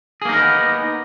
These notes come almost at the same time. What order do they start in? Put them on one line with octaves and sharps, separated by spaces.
G#4 A#3 D#4 A#4 B3